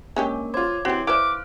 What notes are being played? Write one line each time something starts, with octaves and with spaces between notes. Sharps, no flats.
G#3 A#3 C#4 D4 G4 A#4
F4 C5 C#5 D6 G#6
E3 C4 F#4 G4 F#7
E4 B4 C5 F5 D6 F6 F#6 D7